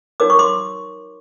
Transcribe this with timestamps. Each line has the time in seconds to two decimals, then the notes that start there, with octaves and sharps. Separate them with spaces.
0.20 D#4 F#4 A#4 C#5 D6
0.30 C#6
0.39 C6 D6